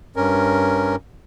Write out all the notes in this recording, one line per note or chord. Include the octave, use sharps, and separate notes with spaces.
G2 C#4 A#4